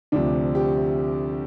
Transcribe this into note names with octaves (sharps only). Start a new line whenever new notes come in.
D2 C3 F3 D4
G4